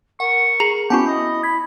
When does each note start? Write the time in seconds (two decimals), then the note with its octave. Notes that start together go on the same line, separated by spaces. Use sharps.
0.20 A#4 F#5 C#6
0.60 G#4 A#5
0.90 B3 C#4 E4 F#4 G4 A5
1.07 D#5
1.43 B5 G#6